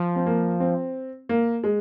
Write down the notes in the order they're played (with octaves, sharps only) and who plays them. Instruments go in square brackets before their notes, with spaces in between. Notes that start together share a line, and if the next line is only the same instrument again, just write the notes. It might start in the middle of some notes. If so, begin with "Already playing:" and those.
Already playing: [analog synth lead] F3
[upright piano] C4
A#3
C4
A#3
G#3